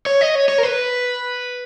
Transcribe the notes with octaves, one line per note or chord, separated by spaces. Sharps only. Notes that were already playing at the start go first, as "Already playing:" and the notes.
C#5
D#5
C#5
C#5
A#4
B4